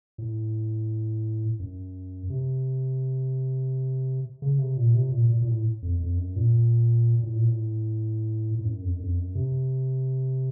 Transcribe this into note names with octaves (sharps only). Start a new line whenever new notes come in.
A2
F#2
C3
C#3
C3
A#2
C3
A#2
A#2
A#2
A2
F2
F2
F#2
A#2
A2
A#2
A2
A2
F#2
F2
F#2
F2
F#2
C3